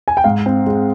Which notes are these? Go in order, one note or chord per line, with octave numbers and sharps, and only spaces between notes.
G#5
G5
G#2 F5
C4
G#3